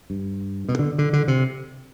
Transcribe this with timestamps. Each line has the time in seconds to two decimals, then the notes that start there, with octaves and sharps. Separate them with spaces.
0.10 G2
0.69 B2
0.79 D3
0.98 D3
1.13 D3
1.28 C3